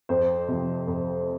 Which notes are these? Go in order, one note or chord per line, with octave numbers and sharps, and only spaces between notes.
F2 C5
C3 F3
F2